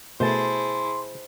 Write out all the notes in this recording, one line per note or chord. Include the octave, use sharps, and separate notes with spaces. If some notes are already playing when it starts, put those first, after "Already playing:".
B2 A3 E4 G#4 C5 A5 C6